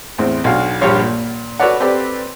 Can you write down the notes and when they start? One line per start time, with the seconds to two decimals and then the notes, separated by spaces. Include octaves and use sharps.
0.18 E2 A2 C4
0.44 B1 D4 F#4 F5
0.81 A#1 G2 F3 G4 C#5 F5
1.01 A#2
1.60 F#4 A4 B4 C#5 D5 F#5
1.80 C4 G4 A4 B4 D5